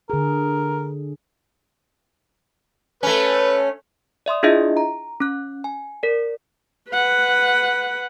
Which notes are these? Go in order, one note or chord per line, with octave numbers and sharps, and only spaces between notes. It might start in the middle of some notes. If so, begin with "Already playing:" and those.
D3 G#4 A#4
A3 C#4 B4
D5 E5 C6 D#6
D4 E4 F4 G#4 D#5 E5
A#5
C#4 F#6
G#5
A#4 D5
B4 F#5